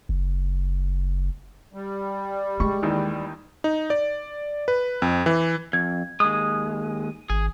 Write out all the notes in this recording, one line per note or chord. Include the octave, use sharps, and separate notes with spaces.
F#1
G3
G#3 C#6
D#2 D#3 E3
D#4
D5
B4
F2
E3
F2 G#6
D#2 G#3 D#6
G#1 G#4